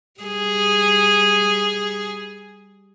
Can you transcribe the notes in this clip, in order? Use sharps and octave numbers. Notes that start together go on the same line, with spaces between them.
G3 G#4